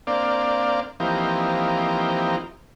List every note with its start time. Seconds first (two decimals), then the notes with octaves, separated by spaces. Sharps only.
0.07 A#3 C4 D4 D5 F5
1.00 E3 F3 A#3 C4 D#4 G4